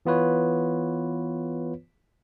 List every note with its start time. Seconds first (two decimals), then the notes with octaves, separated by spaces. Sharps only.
0.06 E3 B3 F4 B4 C#5